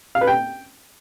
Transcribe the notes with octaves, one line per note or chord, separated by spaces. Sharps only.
F5
B4
G5